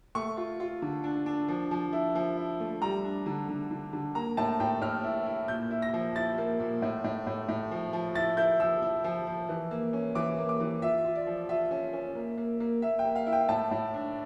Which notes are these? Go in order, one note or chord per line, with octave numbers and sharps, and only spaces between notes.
A3 C#6
F4
F4
D3
D4
D4
F3
F3
E4
F3
E4
A3
G3 A#5
D4
D3
D3
D3
D3
A#3 A#5
A2 A5
A2 G5
A2 F6
E4
E4
A#2 G6
E4
A#6
F3
E4 A6
A#3
A#2
A2
A2
A2
A2
F3
F3
E4 A6
E4 G6
F3 E6
E4
F3
F3
E3
A#3
C#4
E3 D6
A#3
D6
E3
F4 E5
F4
D5
F3
F4 E5
C#4
C#4
A#3
A#3
A#3
A#3 E5
G5
A#3
F5
E4
G5
A2 A5
A2
D4